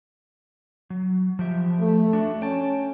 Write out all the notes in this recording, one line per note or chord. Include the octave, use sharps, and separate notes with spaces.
F#3
F3 G4 E5
A3
D4 F#4
C#4 G5 A5